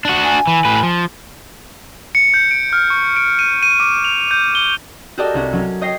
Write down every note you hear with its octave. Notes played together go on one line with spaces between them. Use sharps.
D4 F#4
G#5
E3
A2 B4
F3
C#7
G6
D7
F6
C#6
D7
D#7
D#7
D6
F7
G6
G7
F#4 G4 A4 A#4 D5 D#5
C2 C#4 F#4
F#3 C#4
C#5 D#5 G5 A#6 C7